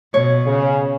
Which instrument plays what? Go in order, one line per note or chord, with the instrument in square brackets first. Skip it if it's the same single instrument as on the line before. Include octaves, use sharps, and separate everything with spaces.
[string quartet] B2 [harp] C#5
[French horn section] C#3